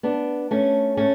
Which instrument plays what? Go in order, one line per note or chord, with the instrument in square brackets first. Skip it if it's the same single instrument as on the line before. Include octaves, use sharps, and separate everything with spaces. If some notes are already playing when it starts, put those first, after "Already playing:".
[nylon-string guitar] B3 D4
A3 C#4
A3 C#4